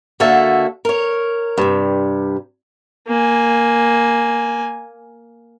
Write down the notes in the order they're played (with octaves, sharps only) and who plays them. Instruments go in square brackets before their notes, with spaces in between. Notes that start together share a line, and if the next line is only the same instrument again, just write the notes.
[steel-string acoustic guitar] D3 A#3 F#4 A4 E5 A5
A#4 C#5
G2 C3
[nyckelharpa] A#3 G#5